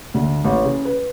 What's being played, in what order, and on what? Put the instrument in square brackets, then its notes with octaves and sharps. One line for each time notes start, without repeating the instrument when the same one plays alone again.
[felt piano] D2
A1
C#3
B4